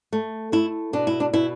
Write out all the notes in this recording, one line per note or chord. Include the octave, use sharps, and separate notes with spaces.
A3
A3 E4
B2 D4
E4
D4
B2 E4